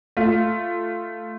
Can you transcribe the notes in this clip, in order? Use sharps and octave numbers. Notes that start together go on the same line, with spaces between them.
A3 F4